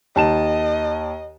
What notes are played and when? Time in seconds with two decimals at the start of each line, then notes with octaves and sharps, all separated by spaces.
0.16 D#2 D#5 A5 E7